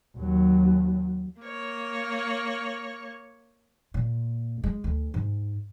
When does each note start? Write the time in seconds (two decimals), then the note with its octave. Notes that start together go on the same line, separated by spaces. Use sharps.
0.17 D#2 F#3
1.41 A#3 C#5
3.94 A#2
4.64 G#3
4.84 D2
5.14 G#2